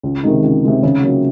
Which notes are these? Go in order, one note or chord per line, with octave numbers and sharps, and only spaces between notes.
C#2
C3 D#3 G#3 D#4
C#2
C3 D#3 G#3 D#4
C#3
F#3 A#3